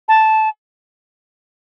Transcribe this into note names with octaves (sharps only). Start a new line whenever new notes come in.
A5